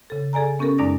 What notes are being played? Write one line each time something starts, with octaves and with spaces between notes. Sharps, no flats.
C#3 A4
G#4 A4 D5 G#5 A#5
B3 C#4 G4 A4 A#4
F#2 G#3 D#4 D5 D6 A#6